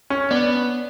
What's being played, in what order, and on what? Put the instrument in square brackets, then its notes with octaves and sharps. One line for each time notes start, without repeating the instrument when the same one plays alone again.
[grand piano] C#4
[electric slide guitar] B3 [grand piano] D4